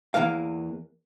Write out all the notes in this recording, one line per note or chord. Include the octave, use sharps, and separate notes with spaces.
E2 C#3 E3 A#3 F5